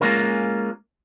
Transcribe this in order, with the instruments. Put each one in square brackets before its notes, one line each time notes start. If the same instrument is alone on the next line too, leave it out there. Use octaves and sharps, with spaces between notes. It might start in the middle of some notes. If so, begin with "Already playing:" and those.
[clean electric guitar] G#3 A#3 C#4 F4 A#4